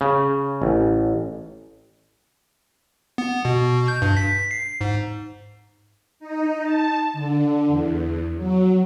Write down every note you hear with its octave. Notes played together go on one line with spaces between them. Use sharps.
C#3
A1
B3
B2
G6
G2
B6
C7
G#2
D#4
A5
D3
E2
F#3